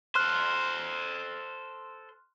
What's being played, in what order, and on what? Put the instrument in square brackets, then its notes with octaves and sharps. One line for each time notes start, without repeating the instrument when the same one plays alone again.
[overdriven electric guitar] A4 C5 [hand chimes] C6 F6 F#6